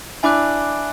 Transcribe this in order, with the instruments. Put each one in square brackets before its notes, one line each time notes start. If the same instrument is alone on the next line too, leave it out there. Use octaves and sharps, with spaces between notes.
[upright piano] D4 E4 [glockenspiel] G#5 B5 D6 F#6